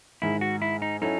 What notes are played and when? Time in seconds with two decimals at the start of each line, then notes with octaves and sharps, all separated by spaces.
0.22 G#2 D#3 G#3 E4
0.41 F#4
0.62 E4
0.82 D#4
1.02 F#3 C#4 D#4 E4 A4